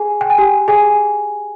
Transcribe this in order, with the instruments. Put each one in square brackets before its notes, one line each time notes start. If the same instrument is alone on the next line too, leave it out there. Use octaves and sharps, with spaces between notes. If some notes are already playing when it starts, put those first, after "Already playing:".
Already playing: [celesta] G#4 G#5
G5
G#5
G4 G5
G#4 G#5